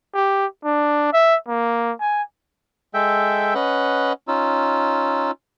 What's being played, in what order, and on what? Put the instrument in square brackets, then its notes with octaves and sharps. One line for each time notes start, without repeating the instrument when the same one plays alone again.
[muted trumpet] G4
D4
E5
A#3
G#5
[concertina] G#3 A4 E5 G5
C#4 B4 D#5 F#5
C#4 D#4 F4 E6